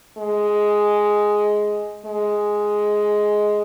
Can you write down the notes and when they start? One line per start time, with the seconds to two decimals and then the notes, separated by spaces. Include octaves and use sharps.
0.18 G#3
2.06 G#3